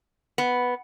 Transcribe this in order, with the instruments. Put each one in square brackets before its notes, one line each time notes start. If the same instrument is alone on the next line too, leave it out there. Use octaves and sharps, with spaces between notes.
[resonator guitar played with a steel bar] B3